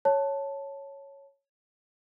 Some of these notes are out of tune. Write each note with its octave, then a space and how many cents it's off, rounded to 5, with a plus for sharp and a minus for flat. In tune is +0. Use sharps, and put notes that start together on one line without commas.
C#5 +0 A5 +0